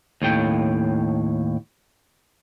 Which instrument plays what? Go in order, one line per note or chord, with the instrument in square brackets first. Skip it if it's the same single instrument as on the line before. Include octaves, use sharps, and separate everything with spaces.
[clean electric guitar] D#2 A2 G5